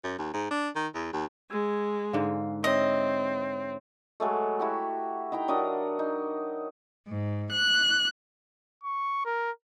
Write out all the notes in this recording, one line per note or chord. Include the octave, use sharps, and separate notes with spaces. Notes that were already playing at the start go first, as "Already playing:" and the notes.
F#2
D#2
G#2
D4
D#3
E2
D#2
G#3 E6 G#6
G#2 D3 F5
C4 C#5 D#5 E5
F#3 G#3 A3
E4 F#4 G4
D#4 E4 G5 A#5
F#3 D4 A#4 D#5
D#4
G#2
F#6
C#6
A#4